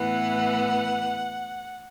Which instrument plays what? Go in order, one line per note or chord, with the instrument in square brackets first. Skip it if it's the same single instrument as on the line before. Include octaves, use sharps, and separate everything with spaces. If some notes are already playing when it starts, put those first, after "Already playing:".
Already playing: [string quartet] A2 E3 B3 F#5